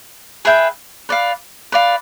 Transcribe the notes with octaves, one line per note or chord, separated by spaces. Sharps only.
G#4 B4 E5 G5
B4 D5 F5
B4 D5 F5